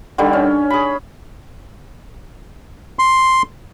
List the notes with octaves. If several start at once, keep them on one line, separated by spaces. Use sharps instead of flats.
D3 D#3 G3
C#4
G#4 B5
C6